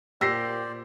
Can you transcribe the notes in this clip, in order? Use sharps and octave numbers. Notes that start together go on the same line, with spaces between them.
A#2 G4 C5 D5 E6 A#6 C7